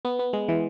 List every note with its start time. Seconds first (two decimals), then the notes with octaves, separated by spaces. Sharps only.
0.05 B3
0.19 B3
0.33 G#3
0.48 E3